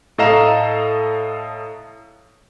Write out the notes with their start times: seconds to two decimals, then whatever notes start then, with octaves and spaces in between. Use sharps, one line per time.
0.18 A2 A4 D#5 F5 A#5 E7